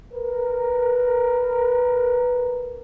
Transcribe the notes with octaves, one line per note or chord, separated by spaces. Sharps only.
A#4 B4